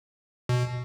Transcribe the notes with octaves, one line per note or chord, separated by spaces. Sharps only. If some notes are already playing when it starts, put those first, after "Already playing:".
B2